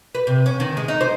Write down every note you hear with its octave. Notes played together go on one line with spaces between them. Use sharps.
B4
C3
C#4
D#3
G#3
D#4
C5